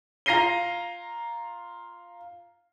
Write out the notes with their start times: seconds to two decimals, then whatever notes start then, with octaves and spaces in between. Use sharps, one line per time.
0.26 F4 A#5 A#6 C7 D#7 G7